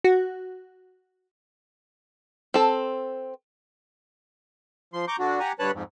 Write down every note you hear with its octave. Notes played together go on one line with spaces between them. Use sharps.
F#4
C4 A4
F3 C6
A#5 C#6 D6 G6
D3 D4 F#4
G4 F#5 G#5 A#5
G2 D3 B4 C#5 A5 F#6
F2 G#2